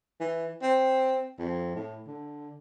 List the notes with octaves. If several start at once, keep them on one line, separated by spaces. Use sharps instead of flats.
E3
C4
F2
A2
D3